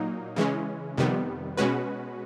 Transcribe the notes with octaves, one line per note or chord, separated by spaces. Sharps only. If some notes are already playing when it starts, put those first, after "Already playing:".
Already playing: A#2 F#3 A#3 D#4
C#3 E3 G#3 C#4
F2 C3 D#3 G3 B3
B2 G#3 C#4 F#4 B4